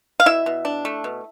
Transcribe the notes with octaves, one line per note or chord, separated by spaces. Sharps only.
F5
B2 E4 E5
B2
D4
A3
B2